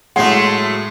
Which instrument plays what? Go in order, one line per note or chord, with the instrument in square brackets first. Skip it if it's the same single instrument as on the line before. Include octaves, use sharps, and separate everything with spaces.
[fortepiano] A2 G#3 [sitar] F#3 A3 [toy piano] F#5 [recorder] C6